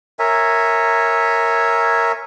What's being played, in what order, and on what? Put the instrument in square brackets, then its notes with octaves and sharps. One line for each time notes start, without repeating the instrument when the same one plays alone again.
[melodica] A#4 C#5 E5 G#5